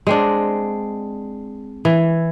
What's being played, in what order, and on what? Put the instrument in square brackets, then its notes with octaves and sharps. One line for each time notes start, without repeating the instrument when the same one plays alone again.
[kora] G#3 C4 D4
E3